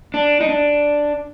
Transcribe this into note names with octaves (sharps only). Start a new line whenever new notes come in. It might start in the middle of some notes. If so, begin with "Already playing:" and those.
D4
D#4
D4